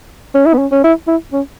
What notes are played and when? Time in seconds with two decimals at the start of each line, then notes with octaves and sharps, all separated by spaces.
0.34 C#4
0.46 E4
0.54 B3
0.58 C#4
0.72 C#4
0.84 E4
1.07 E4
1.32 C#4